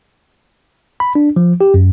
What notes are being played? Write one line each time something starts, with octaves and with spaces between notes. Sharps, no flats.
B5
D4
F3
G4
F#2